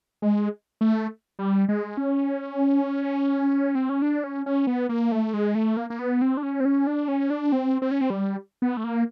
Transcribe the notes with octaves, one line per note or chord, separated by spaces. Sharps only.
G#3
A3
G3
G#3
C#4
C4
C#4
D4
C#4
C#4
B3
A#3
A3
G#3
A3
A#3
A#3
B3
C4
D4
C#4
C4
C#4
D4
C#4
D4
C4
C4
C#4
C4
G3
B3
A3
A#3